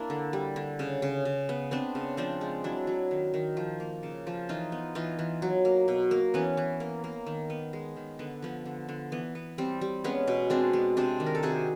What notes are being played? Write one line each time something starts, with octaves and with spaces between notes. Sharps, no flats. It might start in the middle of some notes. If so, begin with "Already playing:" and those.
Already playing: A#3 D4 E4
D3
G3
D3
C#3
C#3
C#3
B3
B3 C4 D4
C#3
F3 C4 D4
G#3
F#3 D4 E4
F#3
D#3
D#3
F3
A#3
C#3
F3
E3 D#4 F4
B3
E3 D#4 F4
E3
F#3
A#3
B2
A#3
E3 B3 C#4
E3
A#3
A#3
D#3
B3
G#3
D#3
D3 B3
F3 B3
D3
D3
E3 B3
B3
G3 C4
G3
G#3 B3 C#4
B2
G#3 C4 D4
G#3
C3 C4 D4
D#3
A#4
A4
C3 F#4 G#4